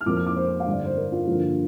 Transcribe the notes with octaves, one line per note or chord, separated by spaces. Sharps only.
F6
F2 F3 A#3 D6
F6
D6
C5
F5
G2 D3 G3
D5
C5
A#4
F4
G2 D3 F3 A#3